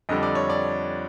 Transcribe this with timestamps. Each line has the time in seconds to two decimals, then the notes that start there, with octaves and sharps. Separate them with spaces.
0.09 F2 D3 G3 D#5
0.23 D5
0.35 C#5
0.50 D5